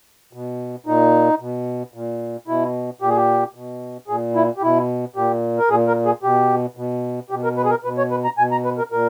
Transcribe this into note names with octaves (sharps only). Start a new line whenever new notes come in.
B2
A#2 D#4
B2
A#2
B2 E4
A#2 G4
G#4
G4
B2
A#2 G#4
E4
G4
B2 E4
A#2 G4
A#4
A#2 G#4
A#4
G#4
B2 G4
B2
B2 G4
A#4
B4
G#4
A#4
B2 B4
C#5
B4
A#5
B2 G#5
A#5
B4
A#4
A#2 A#4